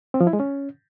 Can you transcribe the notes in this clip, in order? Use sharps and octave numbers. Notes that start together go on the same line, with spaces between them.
C4
F3
E4
G#3
C#4